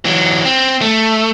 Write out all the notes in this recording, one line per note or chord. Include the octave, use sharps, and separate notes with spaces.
E3 F#3
C4
A3